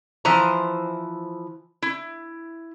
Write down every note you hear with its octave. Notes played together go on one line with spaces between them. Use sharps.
E3 F3 C5 A#5
E4